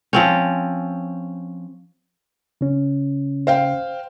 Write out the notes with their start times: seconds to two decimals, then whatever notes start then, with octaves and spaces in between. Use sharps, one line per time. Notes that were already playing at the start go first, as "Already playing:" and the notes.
0.13 F3 C4 C#4
2.61 C#3 C#4
3.47 C5 F5 G5